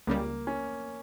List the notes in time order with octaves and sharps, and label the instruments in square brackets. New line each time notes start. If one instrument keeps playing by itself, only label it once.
[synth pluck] C#2 C#3 G3 [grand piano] A#3
[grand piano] C#4